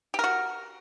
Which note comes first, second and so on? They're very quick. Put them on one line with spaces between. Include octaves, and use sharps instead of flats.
G4 A#4 F#4